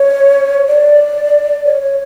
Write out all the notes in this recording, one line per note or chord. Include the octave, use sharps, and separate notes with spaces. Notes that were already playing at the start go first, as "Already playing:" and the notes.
Already playing: C#5
D5
C#5
C#5